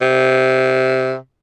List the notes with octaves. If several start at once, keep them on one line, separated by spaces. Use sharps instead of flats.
C3